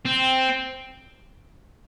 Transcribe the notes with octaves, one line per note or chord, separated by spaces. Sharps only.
C4